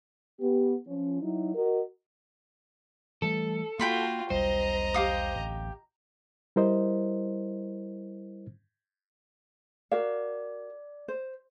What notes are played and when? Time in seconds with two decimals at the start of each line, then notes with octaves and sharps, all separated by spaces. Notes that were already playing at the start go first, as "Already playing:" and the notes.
0.40 B3 G4
0.87 F3 C#4
1.21 F#3 D#4 E4
1.55 F#4 A#4 D#5
3.22 E3 G3 A3 A4
3.79 A#3 F4 F#4 G5 B5 C6
4.30 E1 B1 G3 C5 D#5 A#5
4.94 G4 F5 D#6
5.35 D1 A1
6.56 G3 E4 A#4 C5 D#5
9.92 F#4 A#4 D5 F5
11.08 C5